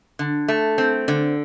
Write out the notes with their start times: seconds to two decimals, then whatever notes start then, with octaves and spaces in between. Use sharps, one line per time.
0.19 D3
0.48 A3
0.78 C4
1.08 D3